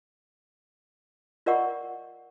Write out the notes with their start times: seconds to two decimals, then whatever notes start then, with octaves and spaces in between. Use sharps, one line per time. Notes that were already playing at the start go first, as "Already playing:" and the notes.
1.46 F4 A#4 D5 D#5 F#5 C#6